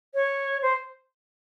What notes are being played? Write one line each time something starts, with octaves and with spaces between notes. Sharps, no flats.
C#5
C5